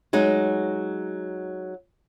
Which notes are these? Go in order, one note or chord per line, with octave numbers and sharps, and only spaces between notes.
F#3 G#3 D#4